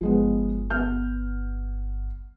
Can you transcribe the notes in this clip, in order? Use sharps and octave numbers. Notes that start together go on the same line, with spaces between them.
G1 F3 G#3 B3
B3 F6 G6